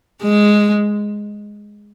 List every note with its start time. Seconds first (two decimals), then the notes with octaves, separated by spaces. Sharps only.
0.23 G#3